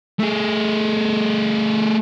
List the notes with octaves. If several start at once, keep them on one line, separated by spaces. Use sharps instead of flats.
A3 G#4